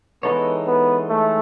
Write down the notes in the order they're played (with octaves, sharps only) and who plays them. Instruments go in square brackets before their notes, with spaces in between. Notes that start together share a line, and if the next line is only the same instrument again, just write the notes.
[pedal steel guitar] E3 G#3 D#4 A4 C#5 [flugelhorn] B3
[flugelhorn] B3
A3